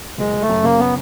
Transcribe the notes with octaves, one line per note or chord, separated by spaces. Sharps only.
F#1 G#3
F#1
A3
F#2
C#3 A#3
B3